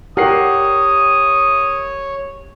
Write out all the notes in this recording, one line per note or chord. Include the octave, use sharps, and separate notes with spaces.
G4 A#4 C#5 F#5 D#6 C7